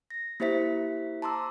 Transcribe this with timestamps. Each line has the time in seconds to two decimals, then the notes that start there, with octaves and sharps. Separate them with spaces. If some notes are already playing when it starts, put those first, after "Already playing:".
0.10 A#6
0.40 A#3 E4 G4 C5 E5 B6
1.22 A5 A#5 C6 D6 E6